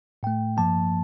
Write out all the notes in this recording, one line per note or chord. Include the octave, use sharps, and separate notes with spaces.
A2 A3 G5
G2 F3 A#3 A5